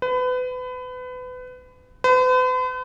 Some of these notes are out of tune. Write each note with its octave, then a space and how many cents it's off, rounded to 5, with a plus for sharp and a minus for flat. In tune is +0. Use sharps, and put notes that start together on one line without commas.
B4 +30
B4 +45